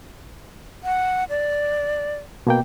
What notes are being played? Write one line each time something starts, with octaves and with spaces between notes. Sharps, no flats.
F#5
D5
B2 A#3 G5